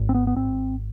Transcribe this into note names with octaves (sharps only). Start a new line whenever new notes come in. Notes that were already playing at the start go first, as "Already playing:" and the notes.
Already playing: G#1 G#2
C4
B3
B3
G#1 C4